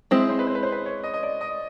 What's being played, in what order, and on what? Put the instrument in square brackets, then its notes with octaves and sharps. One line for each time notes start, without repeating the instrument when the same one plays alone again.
[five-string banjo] G#3 C4 E4 [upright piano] E5
[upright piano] C5
B4
C5
B4
C5
B4
C#5
D#5
D#5
D5
D#5